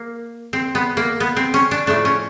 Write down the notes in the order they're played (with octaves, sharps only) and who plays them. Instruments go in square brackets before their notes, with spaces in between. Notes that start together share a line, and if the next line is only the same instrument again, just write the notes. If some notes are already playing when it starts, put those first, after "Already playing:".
Already playing: [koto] A#3
C4
B3
A#3
B3
C4
C#4
D4
A2 F3 A3 D4
C#4